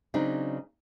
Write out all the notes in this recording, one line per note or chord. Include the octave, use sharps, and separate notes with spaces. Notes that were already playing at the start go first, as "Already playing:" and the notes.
C#3 F#3 C4 D4 D#4